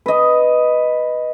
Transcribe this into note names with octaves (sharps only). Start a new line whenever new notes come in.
B4 D#5